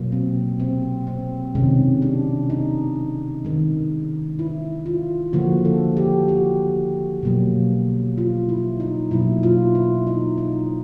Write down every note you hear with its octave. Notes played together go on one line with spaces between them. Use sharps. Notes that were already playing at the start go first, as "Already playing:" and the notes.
Already playing: B2 F#3 A#3
C4
C4
C4
C3 D#3 G#3 C#4
D4
D#4
D#3 G#3
E4
F4
D3 F3 A#3 F#4
A4
G4
F#4
B2 F#3 A#3
F4
E4
D#4
B2 F#3 A#3 E4
F4
E4
D#4
D#4